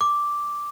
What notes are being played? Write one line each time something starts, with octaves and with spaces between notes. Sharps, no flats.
D6